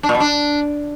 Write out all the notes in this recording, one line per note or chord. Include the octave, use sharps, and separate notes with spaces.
D4
A#2
B2
D4